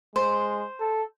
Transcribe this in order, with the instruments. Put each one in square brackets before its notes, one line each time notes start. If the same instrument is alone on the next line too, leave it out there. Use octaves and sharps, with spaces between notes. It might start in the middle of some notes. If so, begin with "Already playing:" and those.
[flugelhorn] G#3 [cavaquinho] C5
[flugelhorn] A4